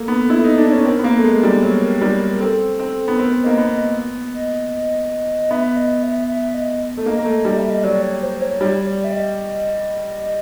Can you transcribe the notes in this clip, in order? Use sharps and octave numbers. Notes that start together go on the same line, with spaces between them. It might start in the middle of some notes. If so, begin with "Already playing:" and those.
Already playing: A#3 A4
B3
E4
D#4
D4
C#4
C4 A#4
B3
A#3
A3
G#3
G3
F#3
G3
C4 A4
C4
B3
C4 A#4
A#3 D#5
B3
D#5
D#5
B3 E5
E5
D#5
E5
E5
D#5
A3
A#3 D#5
A#3
A3
G3
E5
D#5
F#3 D5
C#5
C5
C#5
G3 C#5
D5
E5
D#5